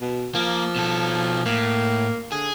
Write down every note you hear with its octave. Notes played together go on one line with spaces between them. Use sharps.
B2
F3 A#3
B2 A4
A2 A#3
D3 G#4